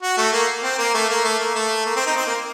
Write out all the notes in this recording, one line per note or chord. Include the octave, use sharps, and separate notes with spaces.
F#4
A3
A#3
C4
A#3
A3
A#3
A3
A#3
A3
A#3
C4
D#4
C4
A#3